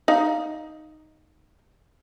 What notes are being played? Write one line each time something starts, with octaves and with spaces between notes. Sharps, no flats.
D#4 F5